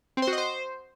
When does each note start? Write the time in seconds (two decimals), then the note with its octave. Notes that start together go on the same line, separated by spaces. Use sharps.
0.17 C4
0.22 C5
0.27 F#4
0.33 D#5
0.38 C5